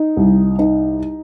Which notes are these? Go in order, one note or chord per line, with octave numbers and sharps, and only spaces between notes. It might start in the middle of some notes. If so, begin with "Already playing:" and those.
Already playing: D#4
C2
D#4